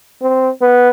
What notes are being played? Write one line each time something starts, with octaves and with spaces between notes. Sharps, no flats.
C4
B3